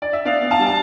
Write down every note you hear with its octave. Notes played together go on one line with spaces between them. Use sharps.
D5
E5
B3 D5 F5
B3
F5 A5
G3
A5